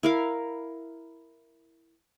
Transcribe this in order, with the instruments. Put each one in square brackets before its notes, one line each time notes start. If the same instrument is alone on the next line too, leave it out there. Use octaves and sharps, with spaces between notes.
[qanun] E4 A#4 F5